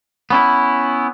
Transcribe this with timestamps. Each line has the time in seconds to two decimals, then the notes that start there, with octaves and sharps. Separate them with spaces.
0.30 B3 C#4 E4